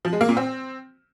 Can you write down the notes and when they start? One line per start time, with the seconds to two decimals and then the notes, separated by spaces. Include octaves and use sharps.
0.05 F3
0.13 G#3
0.21 A#3
0.29 A#2
0.37 C4